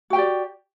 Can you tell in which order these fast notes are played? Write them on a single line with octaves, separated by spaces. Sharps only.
F#4 G5 G4 D5